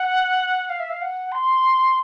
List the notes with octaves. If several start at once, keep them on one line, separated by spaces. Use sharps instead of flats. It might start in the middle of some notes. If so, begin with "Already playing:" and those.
Already playing: F#5
F5
E5
F5
F#5
C6